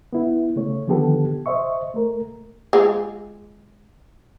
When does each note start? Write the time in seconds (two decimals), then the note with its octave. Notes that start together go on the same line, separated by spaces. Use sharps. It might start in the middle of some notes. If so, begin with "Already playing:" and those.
0.13 B3 E4
0.56 C#3 A3 C#5
0.87 D3 D#3 F3 B3 G4 A4
1.46 C5 D#5 E5 C#6
1.94 A3 A#4
2.73 G#3 F4